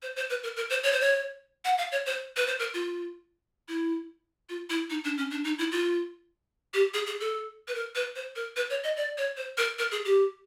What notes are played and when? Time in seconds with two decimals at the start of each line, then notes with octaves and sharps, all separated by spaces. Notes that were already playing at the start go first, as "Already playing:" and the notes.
0.02 C5
0.16 C5
0.30 B4
0.43 A#4
0.56 A#4
0.70 C5
0.83 C#5
0.92 C5
1.01 C#5
1.65 F#5
1.78 F5
1.92 C#5
2.06 C5
2.36 B4
2.47 C5
2.59 A#4
2.74 F4
3.68 E4
4.49 F4
4.70 E4
4.90 D#4
5.04 D4
5.17 C#4
5.31 D4
5.44 D#4
5.58 E4
5.72 F4
6.74 G4
6.94 G#4
7.06 G#4
7.20 A4
7.68 B4
7.75 A#4
7.95 B4
8.16 C5
8.36 A#4
8.56 B4
8.70 C#5
8.84 D#5
8.97 D5
9.18 C#5
9.37 C5
9.58 A#4
9.79 A#4
9.91 G#4
10.05 G4